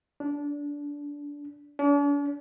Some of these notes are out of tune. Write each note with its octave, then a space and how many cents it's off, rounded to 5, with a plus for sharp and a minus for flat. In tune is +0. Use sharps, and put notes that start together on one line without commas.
D4 -20
D4 -45